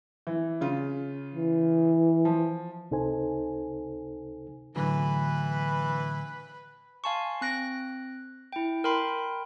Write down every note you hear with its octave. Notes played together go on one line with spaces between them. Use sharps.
E3
C#3 F4
E3
F3
C#2 C3 D#4 A4 C5 G#5
A2 D3 E3 F#3 B4
F5 G#5 A5 C6 C#6
C4 F#6 A#6 D7
E4 G5
A#4 G5 B5 C6